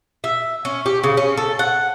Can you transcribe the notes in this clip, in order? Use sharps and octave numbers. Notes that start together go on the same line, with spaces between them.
E5
C#4
G4
C#3
C#4
A4
F#5